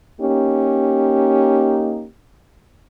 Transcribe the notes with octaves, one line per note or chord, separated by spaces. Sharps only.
A#3 C#4 D#4 G4